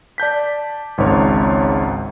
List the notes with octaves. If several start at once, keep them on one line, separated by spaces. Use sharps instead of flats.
D5 A5 G6 B6
G#1 C#2 G#2 C#5